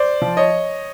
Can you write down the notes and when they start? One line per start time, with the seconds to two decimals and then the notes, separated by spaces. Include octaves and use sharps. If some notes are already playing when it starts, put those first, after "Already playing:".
Already playing: C5 D5
0.22 F3
0.37 C#5 D#5